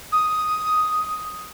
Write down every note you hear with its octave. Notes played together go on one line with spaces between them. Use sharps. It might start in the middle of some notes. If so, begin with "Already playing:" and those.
D#6